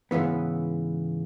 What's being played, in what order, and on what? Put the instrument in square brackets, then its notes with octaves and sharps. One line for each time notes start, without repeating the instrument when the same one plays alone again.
[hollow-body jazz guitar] G#2 C#3 E3 B3